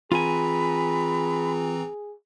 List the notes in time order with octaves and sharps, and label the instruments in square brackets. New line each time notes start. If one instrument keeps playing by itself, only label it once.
[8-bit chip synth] E3 C4 A#5 [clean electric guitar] F4 G#5 [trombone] G#4 [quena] B5